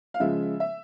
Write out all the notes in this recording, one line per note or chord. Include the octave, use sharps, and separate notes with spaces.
F5
C#3 F3 G#3 E5
E5